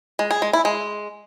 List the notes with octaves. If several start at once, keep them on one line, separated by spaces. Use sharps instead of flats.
G#3
G#4
G#3
E4
G#3